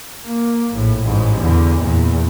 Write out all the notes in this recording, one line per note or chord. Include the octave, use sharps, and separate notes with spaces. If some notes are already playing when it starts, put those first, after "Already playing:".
A#3
A#1 A2
A1 G#2
E2 D3
E2 A#2